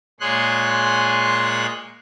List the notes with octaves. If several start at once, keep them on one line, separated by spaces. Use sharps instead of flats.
A#2 G#3 G#4 C#5 C6 F#6